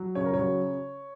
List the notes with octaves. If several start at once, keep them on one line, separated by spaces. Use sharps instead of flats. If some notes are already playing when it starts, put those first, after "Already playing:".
Already playing: F#3
C#3 C#5
A#4
F#3 C#5